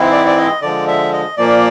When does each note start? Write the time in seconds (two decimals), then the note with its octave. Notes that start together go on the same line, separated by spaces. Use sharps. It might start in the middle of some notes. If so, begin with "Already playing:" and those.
Already playing: G#2 E3 G#3 C4 E4
0.12 D5
0.26 D5
0.37 D#5
0.62 D3 F3 G#3 D5
0.87 E5
1.13 D#5
1.37 A#2 F3 A#3 D5